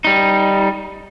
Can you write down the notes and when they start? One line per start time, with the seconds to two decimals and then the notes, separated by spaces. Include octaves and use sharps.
0.05 G3 D#4